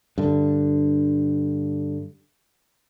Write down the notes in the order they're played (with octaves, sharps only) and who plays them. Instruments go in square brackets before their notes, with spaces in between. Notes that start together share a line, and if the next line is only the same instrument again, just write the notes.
[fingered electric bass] G2 D3